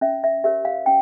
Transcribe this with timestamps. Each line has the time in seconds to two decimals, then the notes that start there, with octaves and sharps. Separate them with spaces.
0.01 C#4 E5
0.24 E5
0.44 G4 A#4 C#5 E5
0.65 F5
0.86 C#4 G5